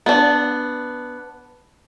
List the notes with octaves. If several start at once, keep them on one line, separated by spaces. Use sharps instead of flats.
B3 D4